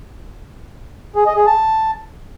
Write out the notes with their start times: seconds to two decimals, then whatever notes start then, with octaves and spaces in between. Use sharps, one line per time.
1.16 G#4
1.26 D#5
1.36 G#4
1.47 A5